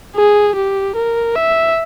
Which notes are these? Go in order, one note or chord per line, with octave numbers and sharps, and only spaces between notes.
G#4
G4
A#4
E5